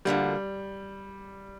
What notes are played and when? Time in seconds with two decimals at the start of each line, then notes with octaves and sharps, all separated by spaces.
0.05 D2 D3 F3 G3 A#3